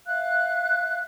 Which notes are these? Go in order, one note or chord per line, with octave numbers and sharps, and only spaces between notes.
E5 F5 F#6